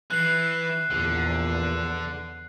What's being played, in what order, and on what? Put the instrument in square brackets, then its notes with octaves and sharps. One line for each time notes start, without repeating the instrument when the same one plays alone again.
[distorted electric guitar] E3 [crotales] F#6 C7
[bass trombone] A#1 [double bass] E2 [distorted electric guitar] D3